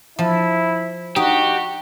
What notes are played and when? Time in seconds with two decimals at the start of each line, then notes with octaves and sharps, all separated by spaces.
0.19 F3 E4
1.16 D#4 F#4 G4